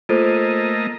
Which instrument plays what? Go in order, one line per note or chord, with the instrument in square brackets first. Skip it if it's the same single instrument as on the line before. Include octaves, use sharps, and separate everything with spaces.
[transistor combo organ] A3 A#3 D#5 [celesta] F4 A4 C5